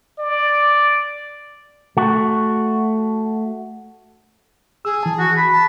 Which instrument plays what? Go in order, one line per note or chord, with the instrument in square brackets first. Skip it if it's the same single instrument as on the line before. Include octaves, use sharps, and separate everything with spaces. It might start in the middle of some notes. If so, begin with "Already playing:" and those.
[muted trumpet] D5
[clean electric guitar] A3 F#4
[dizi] G#4 [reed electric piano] E6
[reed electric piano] E3 A5
[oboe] F#4
B5
[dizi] A5